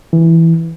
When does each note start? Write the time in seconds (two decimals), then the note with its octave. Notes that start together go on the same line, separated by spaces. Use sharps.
0.13 E3